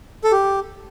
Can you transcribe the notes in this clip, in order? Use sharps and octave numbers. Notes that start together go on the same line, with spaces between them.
A4
G4